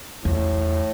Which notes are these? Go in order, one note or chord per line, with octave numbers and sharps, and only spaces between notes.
E2 A2